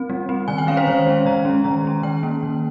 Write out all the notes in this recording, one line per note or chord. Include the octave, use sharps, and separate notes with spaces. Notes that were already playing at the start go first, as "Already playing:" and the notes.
Already playing: C4
G3
C4
D#3 G#5
G5
G#3 C#4 F5
C5
D#3 C#5
G#3 C#4
D#3 A#5
G#3 C#4
D#3 A#5
G#3 C#4
D#3 G5
A#3 C#4
D#3